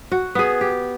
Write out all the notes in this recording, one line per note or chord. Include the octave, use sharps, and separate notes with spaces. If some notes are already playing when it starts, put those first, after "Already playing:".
F#4
B3 G#4
G4